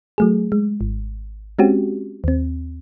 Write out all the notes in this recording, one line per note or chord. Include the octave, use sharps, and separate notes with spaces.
F#3 A3 G#4
G#3
G#1
G#3 C4 C#4 F#4 G4
D#2 C4